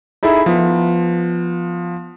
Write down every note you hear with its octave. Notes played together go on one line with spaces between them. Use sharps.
D#4 E4 G#4 A4 E5 B5
F3 B3